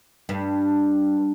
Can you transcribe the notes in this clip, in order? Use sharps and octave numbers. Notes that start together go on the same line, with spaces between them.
G2